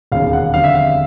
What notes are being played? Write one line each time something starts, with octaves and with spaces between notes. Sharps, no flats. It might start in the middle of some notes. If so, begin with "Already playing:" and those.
E1 D#2 C#3 F5
F#5
F2 D3 G3 F5
E5
F5